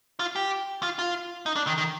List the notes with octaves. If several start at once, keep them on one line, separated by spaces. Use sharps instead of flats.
F4
G4
F4
F4
D#4
D4
D#3
D#3